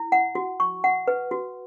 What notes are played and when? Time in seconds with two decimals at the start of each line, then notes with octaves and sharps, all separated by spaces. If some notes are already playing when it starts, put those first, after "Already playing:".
Already playing: E4
0.12 F#5
0.35 F#4
0.60 C#6
0.84 F#5
1.08 B4
1.31 F#4